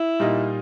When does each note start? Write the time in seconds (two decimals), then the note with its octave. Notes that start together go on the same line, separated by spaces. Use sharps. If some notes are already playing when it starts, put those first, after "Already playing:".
Already playing: E4
0.20 A#2 G3 A#3 D#4